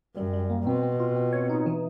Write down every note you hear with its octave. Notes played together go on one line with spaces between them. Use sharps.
F#2 G3
G3
A#3
B2 C4
C4
F4
C4
C#5
D#4
E3